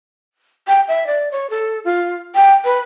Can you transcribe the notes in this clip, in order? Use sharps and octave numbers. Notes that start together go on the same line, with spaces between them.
G5
E5
D5
C#5
A4
F4
G5
B4